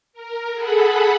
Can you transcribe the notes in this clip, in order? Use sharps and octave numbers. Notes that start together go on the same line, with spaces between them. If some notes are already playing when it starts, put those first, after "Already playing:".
A#4
G#4 A4 F#5 B5